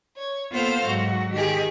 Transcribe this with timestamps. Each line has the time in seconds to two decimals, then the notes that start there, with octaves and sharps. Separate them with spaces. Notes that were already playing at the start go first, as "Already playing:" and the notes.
0.17 C#5
0.53 A#3 B3 F4 A4 C5 F5
0.85 G#2 F#3 F#4
1.33 D#3 G4 G#4